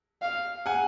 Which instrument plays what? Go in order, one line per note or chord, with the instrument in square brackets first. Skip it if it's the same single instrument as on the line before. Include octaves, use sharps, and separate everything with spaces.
[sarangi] F5
[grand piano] F#5 G#5